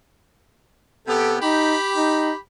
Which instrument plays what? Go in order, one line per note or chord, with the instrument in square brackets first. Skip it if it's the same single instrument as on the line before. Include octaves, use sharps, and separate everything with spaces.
[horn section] C3 B3 G4 [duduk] A4
[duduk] D#4 [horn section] G4 B5
[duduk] D#4